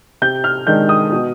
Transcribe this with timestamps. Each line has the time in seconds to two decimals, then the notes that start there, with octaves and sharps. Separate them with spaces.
0.22 C3 G6
0.44 F6
0.67 D#3 G#3 D4 G6
0.89 D#6
1.12 B2